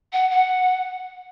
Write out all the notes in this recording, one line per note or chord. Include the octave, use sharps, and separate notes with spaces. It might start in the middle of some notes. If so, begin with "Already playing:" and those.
F#5
F#5